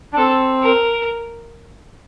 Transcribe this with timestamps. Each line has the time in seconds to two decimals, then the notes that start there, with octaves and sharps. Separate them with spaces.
0.13 D4
0.17 C4 A4
0.63 A#4